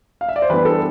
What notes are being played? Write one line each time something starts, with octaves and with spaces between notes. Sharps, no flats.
F5
E5
D5
C5
E3 G3 B3 D4 B4
A4